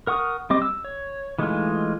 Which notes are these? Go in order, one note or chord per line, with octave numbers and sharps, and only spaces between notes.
A#4 F#5 C#6 D#6
G3 C4 D#5 D6
E6
C#5
E3 G#3 A3 D#4 F4